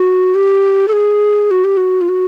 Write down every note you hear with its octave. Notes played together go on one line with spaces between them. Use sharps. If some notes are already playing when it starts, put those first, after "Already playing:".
Already playing: F#4
G4
A4
G#4
F#4
G4
F#4
F4
F#4